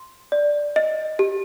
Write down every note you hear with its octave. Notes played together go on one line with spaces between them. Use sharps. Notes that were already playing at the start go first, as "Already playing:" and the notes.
Already playing: C6
D5
D#5
G4